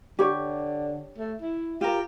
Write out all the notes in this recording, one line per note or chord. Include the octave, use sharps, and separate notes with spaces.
D3 G4 C#5
A3
E4
F4 G4 A#4